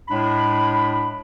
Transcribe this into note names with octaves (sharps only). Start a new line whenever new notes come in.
A2 G#3 D4 B5